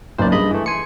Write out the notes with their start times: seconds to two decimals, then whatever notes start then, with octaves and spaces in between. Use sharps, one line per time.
0.18 F#1 B1 F#2 C5 D5
0.32 G2 G#4 D#5 B5
0.51 E3 A3
0.66 G#5 C6 C#7